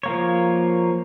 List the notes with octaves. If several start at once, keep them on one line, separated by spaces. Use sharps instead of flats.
F3 A#3 C#5